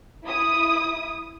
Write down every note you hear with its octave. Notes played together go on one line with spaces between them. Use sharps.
E4 D#6